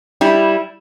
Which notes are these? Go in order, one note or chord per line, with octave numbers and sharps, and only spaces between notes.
G3 E4